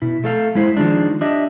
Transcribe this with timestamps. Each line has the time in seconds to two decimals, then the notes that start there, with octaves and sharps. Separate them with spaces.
0.02 B2 E4
0.24 A3 A4 F5
0.55 G#3 E4 C5
0.77 D#3 F3 G#3 D4
1.21 D4 G4 D#5 E5